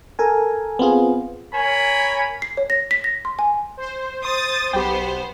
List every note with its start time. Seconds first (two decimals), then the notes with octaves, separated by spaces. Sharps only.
0.19 A4 A#4 G#5
0.79 B3 C4 F4 G#4
1.54 A#4 C#5 G#5 B5
2.42 C7
2.57 C#5
2.70 A#6
2.91 B6
3.04 A#6
3.25 C6
3.39 G#5
3.77 C5
4.25 C6 D#6 A6
4.74 B1 B3 G4 C5 G5